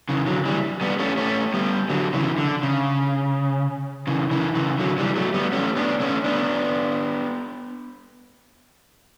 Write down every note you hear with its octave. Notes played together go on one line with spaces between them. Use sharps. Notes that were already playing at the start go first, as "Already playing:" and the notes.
C#3 E3
D3 F#3
E3 G3
G3 B3
A3 C#4
A3 C#4
G3 B3
D3 F#3
C#3 E3
D3
C#3
C#3 E3
C#3 E3
C#3 E3
D3 F#3
E3 G3
F#3 A3
G3 B3
A3 C#4
B3 D4
A3 C#4
B3 D4